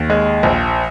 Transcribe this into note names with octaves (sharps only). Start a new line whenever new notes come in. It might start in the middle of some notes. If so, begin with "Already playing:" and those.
Already playing: D#2
G#3
A#1